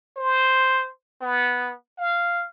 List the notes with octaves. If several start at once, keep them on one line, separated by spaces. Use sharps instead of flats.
C5
B3
F5